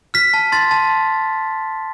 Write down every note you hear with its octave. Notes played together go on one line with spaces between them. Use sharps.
F6 B6
A5
C6 A6
A5